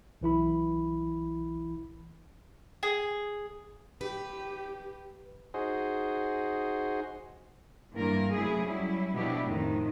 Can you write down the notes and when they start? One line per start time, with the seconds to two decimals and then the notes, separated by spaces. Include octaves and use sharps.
0.21 B1 E3 E4 B5
2.83 G#4
4.01 G4 B4
5.54 D#4 F#4 G#4 C5
7.95 G2 E3 A#3 A#4
8.35 F#2 C3 A3 E4 G#4
8.66 F#3 G3 C#4 E4
9.15 B2 F3 B3 D4 E4 G4
9.45 F2 A2 D#3